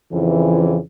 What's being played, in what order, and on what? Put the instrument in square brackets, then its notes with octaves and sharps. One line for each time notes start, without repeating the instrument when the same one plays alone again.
[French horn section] F2 C#3 E3